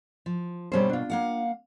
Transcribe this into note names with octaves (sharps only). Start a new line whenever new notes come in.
F3
G2 B2 G3 C#4 C5
D4 F4
A#3 F5 F#5